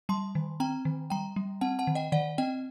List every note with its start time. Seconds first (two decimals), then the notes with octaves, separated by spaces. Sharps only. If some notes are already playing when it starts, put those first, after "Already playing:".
0.09 G3 A5 C6
0.35 D#3
0.60 C4 G5 A#5
0.85 D#3
1.10 G3 G5 A#5
1.36 G3
1.61 C4 F#5 A5
1.79 F#5 A5
1.87 D#3
1.95 D#5 G5
2.12 D#3 D5 F#5
2.38 C4 D#5 G5